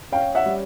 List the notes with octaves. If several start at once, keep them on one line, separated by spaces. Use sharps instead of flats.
C#4 F5 G5
E5 F#5
G3